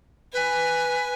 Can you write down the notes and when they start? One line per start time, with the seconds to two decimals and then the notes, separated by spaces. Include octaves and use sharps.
0.33 B4 G#5